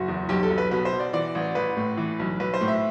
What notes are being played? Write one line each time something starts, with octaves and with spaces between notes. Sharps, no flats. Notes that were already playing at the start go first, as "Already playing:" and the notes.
Already playing: F#1 F#4
E2
B1 G4
A4
B1
B4
B2 B4
C5
B2
D5
E3 D5
A1
A1 B4
A2
E3
B1
B1 B4
C5
A2
E5